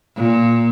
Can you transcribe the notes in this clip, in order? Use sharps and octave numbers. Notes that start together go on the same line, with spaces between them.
A#2